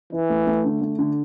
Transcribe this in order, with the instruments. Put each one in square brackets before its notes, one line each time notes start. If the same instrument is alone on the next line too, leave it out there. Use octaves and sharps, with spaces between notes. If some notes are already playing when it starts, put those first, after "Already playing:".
[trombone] E3 [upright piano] E4
[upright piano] A3
A3
D3
A3
D3